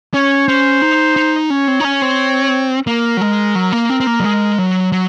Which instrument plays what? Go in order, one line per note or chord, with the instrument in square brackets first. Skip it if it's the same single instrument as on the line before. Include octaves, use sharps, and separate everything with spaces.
[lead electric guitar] C#4 [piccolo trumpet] C#5
[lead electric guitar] C#4 [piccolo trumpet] C5
[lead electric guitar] D#4
D#4
[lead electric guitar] C#4 [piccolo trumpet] C#5
[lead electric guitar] C4
D#4
C#4
C4
[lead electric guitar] A#3 [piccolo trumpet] A#4
[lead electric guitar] F#3
G#3
F#3
A#3
C4
C4
A#3
F#3
G#3
F#3
F#3